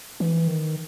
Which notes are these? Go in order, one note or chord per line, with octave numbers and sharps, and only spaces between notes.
E3
D#3